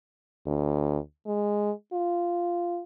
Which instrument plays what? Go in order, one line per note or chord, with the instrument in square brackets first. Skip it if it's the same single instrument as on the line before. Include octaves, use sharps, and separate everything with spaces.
[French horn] D2
G#3
F4